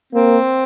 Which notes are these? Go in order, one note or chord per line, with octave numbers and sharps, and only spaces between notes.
A#3 C4